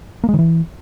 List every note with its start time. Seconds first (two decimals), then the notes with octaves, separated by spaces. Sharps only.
0.24 A#3
0.29 G#3
0.34 D#3
0.39 E3